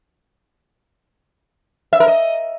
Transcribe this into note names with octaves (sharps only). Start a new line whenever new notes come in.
E5
A#4
D#5